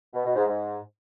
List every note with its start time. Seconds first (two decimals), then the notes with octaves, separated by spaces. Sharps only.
0.14 B2
0.25 B2
0.36 G#2
0.47 G#2